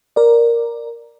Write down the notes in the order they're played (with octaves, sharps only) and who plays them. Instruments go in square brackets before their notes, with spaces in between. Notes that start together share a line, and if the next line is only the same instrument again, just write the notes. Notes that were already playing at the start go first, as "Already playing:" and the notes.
[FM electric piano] A#4 D5